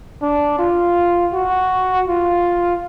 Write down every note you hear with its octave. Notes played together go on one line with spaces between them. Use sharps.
D4
F4
F#4
F4